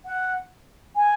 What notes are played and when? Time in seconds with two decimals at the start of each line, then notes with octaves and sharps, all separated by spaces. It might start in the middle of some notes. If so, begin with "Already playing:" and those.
0.05 F#5
0.96 G#5